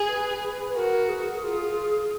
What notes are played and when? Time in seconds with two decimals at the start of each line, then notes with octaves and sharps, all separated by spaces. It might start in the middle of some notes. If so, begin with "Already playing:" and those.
Already playing: G#4
0.08 B4
0.75 F#4 A#4
1.09 G#4
1.43 F4